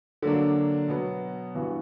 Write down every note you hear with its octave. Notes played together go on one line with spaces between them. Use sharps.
D3 F#3 A#3 D4
B2 F#3 B3
G2 E3 B3 F#4